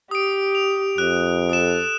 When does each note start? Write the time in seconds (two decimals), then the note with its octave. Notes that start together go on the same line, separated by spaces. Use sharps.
0.11 G4 D#6 D7
0.55 F7
0.98 F2 F#6
1.49 A4 D#6 E7